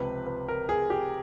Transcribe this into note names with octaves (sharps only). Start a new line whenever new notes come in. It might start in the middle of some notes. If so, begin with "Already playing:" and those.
Already playing: C#2 C3 F3 B4
B4
A#4
G#4
G4